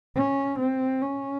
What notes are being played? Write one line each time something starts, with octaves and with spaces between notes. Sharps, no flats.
C#4
C4
C#4